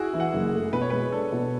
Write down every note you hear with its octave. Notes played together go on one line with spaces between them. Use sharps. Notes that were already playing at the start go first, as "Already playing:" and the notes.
Already playing: E4 F#4 G#4
E3
F#5
F#1
A3
B2 B4
C#5
B4
G#3
D4 A4
B2